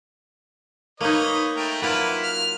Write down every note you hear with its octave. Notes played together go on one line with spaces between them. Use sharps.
A#3 D#4 B4 C#5 D#5
A3 A#4 G5
F#3 A#3 E4 F4 B4
F6